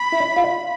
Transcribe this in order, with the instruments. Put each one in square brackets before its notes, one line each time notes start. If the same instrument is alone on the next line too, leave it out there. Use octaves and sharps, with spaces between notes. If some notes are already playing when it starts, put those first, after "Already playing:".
Already playing: [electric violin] B5
[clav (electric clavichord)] E4
F4